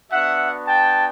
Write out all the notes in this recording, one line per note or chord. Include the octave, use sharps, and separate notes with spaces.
B3 D4 F#4 E5 F#5
G5 A5